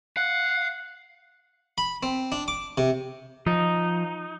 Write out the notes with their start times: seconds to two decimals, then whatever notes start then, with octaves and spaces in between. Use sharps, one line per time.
0.17 F5 F#5
1.78 B5
2.03 C4
2.32 D4
2.48 D6
2.78 C3
3.46 F3 D#4